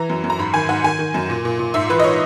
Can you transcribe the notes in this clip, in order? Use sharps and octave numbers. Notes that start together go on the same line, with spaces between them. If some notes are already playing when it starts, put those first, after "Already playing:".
Already playing: E3 A#5
F#2
F#2
A#5
G#2 B5
D#3 G#5
G#2 F#5
D#3 G#5
D#3
F#2
A#2
A#2
A#2
G#2 E5
E3 B4
D#5
C#5